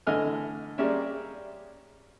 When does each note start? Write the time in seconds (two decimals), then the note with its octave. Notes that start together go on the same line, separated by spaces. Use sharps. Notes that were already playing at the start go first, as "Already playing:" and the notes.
0.07 D3 E3 A3 D#5 G#5 F6
0.78 G3 G#3 A#3 C#4 D5 E5